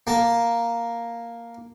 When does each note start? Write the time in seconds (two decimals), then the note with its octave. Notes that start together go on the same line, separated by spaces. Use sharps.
0.07 A#3 A5